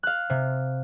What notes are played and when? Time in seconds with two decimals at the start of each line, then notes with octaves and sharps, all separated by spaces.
0.03 F5 F#6
0.30 C3